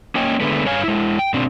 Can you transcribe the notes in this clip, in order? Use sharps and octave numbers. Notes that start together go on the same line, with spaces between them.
A#3 C#4 C#5 D#5 G5 G#5
D3 G#3 A3 B3
G2 C#5 F5 G#5
G#3 E4
G5
B2 C4 D4